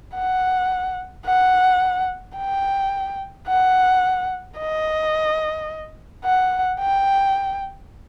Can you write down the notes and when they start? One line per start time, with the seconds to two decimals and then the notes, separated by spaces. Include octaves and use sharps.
0.16 F#5
1.26 F#5
2.37 G5
3.48 F#5
4.58 D#5
6.24 F#5
6.80 G5